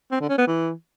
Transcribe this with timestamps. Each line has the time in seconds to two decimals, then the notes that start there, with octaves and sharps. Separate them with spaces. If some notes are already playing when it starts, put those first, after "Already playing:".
0.11 C4
0.20 D3
0.29 C#4
0.38 B3
0.47 E3